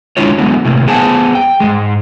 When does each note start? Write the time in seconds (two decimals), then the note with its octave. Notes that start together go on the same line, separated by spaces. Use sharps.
0.17 G#3 D4 E4 F4 C#5
0.38 D3 F#3 G#3 B3
0.65 A2 C3 A#3
0.87 B3 G#4 C5 F#5 G#5 A5
1.35 G5
1.60 G#2 G#3